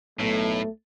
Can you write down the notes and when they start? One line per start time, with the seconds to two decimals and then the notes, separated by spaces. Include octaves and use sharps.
0.19 B1 A2 A3